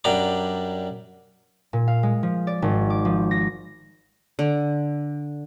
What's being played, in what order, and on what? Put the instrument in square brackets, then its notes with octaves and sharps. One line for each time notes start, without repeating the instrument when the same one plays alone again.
[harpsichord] F#2 G3 D4 A#5 B5 D6
[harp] A#2
F5
G#3
F3
D5
G#1
D6
F3
A#6
[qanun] D3